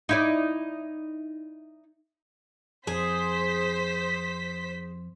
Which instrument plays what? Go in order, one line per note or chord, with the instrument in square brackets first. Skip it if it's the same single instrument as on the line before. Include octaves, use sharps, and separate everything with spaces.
[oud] D#4 E4 D5
[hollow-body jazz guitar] F2 [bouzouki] G#4 [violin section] C5 B6